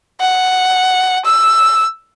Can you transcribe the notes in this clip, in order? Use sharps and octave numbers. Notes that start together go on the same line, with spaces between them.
F#5
E6